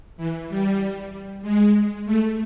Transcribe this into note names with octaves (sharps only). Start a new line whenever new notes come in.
E3
G3
G#3
A3